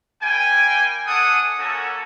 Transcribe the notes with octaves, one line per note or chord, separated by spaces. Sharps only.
G3 A#3 G5 G#5
D4 A4 F#5 G#5 D#6
A#3 C#4 F#4 A4